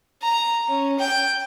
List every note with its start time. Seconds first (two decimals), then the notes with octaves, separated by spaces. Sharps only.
0.22 A#5
0.68 C#4
0.99 G5